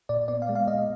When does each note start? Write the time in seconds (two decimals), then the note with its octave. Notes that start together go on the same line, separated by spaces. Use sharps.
0.09 A#2 D5
0.28 B3 D5
0.42 F5
0.49 G#3
0.55 F5
0.67 A#2 D#5